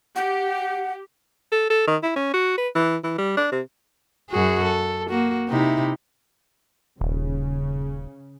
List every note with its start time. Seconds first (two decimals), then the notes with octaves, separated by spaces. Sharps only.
0.16 G4 F#5
1.52 A4
1.70 A4
1.87 D#3
2.03 E4
2.16 C#4
2.33 F#4
2.57 B4
2.75 E3
3.03 E3
3.18 G3
3.37 D4
3.52 C3
4.30 F#2 F#4 G#4
4.64 A4
5.10 A#3 F#4
5.49 C3 D#4 E4
7.01 D#1 C#3